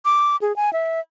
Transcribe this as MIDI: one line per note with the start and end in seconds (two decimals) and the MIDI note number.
0.05 0.36 86
0.42 0.55 68
0.56 0.72 80
0.73 1.00 76